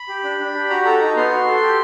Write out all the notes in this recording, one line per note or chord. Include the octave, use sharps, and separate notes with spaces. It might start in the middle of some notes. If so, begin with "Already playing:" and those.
Already playing: B5
G4
D4
D4
G4
F#4 A#5
A4 A#5
D#4 A#5
B3 C6
F#4
A4
G4